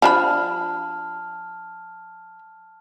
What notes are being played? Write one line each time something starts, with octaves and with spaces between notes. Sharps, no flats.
F3 D4 A5 B5 F6